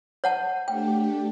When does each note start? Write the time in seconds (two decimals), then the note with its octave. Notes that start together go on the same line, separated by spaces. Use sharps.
0.24 C#5 F#5 A5
0.68 A3 D4 G4 G5